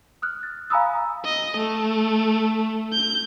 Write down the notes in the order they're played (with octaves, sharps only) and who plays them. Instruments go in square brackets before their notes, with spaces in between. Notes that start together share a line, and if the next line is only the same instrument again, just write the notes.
[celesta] D#6 F6 F#6
A6
F5 G#5 A#5 B5 D#6 E6
[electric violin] D#5
A3
G6